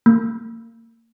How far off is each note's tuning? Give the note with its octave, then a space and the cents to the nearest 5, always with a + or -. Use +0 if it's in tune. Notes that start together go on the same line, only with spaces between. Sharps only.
A#3 -30